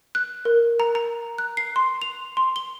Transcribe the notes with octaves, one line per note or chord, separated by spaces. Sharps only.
F#6
A#4
A#5
A#5
F#6
C7
C6
F7
C6
G7